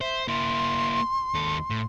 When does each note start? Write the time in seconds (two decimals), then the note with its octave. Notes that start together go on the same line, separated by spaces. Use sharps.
0.01 C5 E5
0.28 A#3 E4 C6
1.34 D#2 A4
1.70 A2